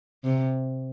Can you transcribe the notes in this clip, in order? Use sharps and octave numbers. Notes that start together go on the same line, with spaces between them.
C3